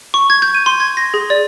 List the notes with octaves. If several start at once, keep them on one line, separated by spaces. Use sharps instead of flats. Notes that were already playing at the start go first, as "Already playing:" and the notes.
C#6
G#6
G6
D#7
C6
G#6
A#6
G#4
D5